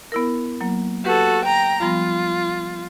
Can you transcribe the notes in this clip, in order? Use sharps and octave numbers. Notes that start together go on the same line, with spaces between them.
B3 E4 A#4
F#3 A#3
F#4 G4 A4 B4
G5 A#5
F3 G3 B3 F4